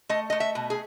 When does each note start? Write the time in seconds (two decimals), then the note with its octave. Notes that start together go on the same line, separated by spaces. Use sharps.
0.09 A3 D#5
0.30 A3 D#5
0.40 E5
0.55 B2
0.70 G#4